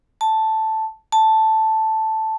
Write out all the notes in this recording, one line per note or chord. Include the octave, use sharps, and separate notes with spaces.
A5
A5